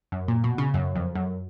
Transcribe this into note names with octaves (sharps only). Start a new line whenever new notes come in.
F#2
A#2
B2
C#3
F#2
F2
F#2